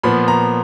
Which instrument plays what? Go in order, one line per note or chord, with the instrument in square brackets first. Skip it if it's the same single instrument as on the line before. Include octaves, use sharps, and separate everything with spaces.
[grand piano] A#2 F3 B3 B5
A#5